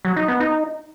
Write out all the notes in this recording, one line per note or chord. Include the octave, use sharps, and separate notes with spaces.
F#3
D#4
B3
D#4